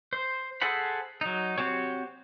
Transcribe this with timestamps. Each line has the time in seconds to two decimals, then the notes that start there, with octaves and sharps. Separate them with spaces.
0.13 C5
0.62 G#4 A4 C5 F#5 B5
1.21 F#3 D#4
1.58 C4 F#4 G4 C#5